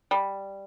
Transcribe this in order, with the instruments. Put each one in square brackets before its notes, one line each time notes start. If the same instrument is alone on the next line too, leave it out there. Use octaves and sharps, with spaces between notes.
[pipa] G3